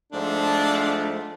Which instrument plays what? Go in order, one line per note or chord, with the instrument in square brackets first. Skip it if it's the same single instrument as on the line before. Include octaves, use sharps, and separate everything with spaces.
[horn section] G#2 F3 A3 [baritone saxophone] D4